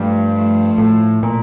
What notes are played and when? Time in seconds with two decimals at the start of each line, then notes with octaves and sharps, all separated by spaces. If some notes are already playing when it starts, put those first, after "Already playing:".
Already playing: G2 F3 A3
0.34 F3 A3
0.78 A2
1.23 A#2